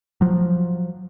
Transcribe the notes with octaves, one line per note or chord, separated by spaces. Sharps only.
F3 F#3